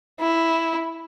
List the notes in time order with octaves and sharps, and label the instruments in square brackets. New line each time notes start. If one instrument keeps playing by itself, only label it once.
[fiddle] E4